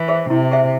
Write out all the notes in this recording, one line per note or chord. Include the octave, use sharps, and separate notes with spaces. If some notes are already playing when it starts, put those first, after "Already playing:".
Already playing: E3
G#4 C5 E5
C3 E4
G#4 C5 E5